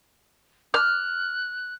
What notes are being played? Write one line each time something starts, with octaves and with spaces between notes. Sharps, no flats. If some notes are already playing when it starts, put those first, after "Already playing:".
F6 F#6